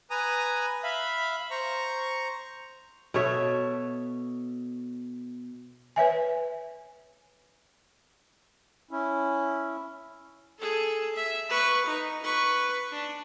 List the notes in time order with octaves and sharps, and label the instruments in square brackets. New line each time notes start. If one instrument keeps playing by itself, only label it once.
[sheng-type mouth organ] B4 G#5 A#5 D#6
E5 F5 B5
C5 A#5 C#6
[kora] B2 A4 C#5 E5
[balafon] B4 C#5 E5 G#5
[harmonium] C#4 E4
[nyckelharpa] G#4 A4
E5
B4 C#6
D#4
B4 C#6
D4